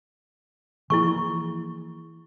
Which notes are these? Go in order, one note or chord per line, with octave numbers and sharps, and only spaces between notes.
E3 F3 A#3 E4 G#4 C#6